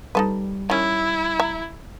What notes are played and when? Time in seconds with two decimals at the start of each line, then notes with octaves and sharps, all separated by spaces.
0.15 G3 D#4 A4 B4
0.70 D#3 C#4 E4
1.40 E5 A#5